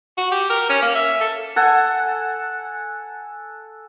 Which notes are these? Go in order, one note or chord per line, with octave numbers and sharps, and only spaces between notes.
F#4
G4
A#4
C#4
A#3
E5
A4
A4 F#5 G#5